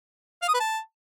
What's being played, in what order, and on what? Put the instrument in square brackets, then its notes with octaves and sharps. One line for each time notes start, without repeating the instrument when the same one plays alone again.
[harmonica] F5
D#6
B4
A5